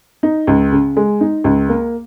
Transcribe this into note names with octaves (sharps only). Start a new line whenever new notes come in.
D#4
C#2
C#3
G#3
D#4
C#2
A#3